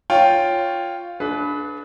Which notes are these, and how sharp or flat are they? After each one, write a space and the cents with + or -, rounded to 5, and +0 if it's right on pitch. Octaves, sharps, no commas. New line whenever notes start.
F4 +0 C#5 +0 G5 +0
D4 +0 G#4 +40 B4 +0